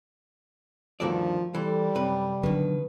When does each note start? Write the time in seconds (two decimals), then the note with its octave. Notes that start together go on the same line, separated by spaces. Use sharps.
1.00 D2 G2 D#3 F3 F#4 A4 D5
1.55 E3 G3 A4 C5
1.95 F#2 C3 B4
2.43 B2 D3 D#3 F#3 B4